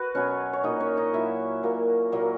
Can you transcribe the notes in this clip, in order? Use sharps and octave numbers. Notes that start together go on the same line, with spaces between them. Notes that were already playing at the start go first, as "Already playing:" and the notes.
Already playing: F#4 B4
B2 F#3 B3 C#4 C#5
C#5
A#2 F#3 A#3 D#4 D#5
C#4 C#5
D#4 D#5
A#2 F#3 A#3 E4 E5
A#2 F#3 A#3
A#2 F#3 A#3